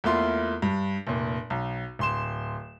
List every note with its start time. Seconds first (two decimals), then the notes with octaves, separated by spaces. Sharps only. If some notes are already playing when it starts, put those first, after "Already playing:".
0.04 E2 A3 A#3 E4 F4 C6
0.62 G2
1.07 F1 A#2
1.50 B1
1.99 D1 C6 E7